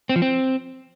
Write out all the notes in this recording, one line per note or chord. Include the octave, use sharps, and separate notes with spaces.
C4
F3
C4